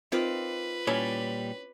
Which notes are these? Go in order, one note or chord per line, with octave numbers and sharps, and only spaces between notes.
D#3 C4 F4 B4 D5
A#2 G3 C#4 E4 C#5 D5